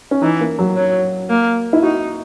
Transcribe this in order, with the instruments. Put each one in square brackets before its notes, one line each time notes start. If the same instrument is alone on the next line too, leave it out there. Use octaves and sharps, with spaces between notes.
[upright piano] C#4
[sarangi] E3 [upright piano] D#4
[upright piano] A#3
F#3
[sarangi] F#3
A#3
[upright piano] E4
[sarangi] D#4 [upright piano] F#4